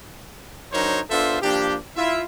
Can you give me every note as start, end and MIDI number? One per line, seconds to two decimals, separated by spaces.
0.73 1.00 54
0.73 1.00 62
0.73 1.00 63
0.73 1.00 70
0.73 1.00 72
0.73 1.00 73
1.10 1.37 59
1.10 1.37 62
1.10 1.37 65
1.10 1.37 69
1.10 1.37 72
1.10 1.37 76
1.42 1.77 53
1.42 1.77 58
1.42 1.77 62
1.42 1.77 67
1.96 2.22 64
1.96 2.22 65
1.96 2.22 76